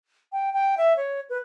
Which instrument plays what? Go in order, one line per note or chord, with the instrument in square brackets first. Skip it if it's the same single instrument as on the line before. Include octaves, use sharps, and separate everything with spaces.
[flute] G5
G5
E5
C#5
B4